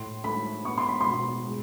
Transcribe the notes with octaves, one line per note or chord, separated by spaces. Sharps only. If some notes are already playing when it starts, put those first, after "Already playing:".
Already playing: A2 C6
A3 B5
B3 C#6
C6
B5
C6
B2
G#3